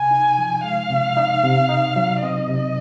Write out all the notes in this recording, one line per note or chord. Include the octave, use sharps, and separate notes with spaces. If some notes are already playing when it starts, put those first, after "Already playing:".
Already playing: C3 G#5
D#4
F3
G#3 F5
C3
D#4
C3
D#4
F#3
C4 D#5
C3